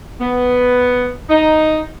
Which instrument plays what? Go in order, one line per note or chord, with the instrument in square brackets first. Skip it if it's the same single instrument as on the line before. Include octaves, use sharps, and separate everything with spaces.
[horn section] B3
D#4